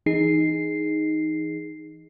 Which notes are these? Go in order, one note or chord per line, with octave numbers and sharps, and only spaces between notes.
E3 D#4 G#4 C7